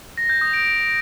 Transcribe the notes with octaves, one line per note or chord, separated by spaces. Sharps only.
A#6
G6
D#6
D7